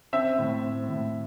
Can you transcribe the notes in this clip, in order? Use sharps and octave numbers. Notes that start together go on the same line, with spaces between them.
C4 E5
A2
C4
A2